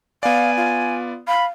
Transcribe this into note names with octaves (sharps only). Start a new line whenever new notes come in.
B3 D5 F5 G#5
F4
F5 B5